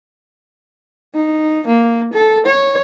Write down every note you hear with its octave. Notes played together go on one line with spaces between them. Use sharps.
D#4
A#3
A4
C#5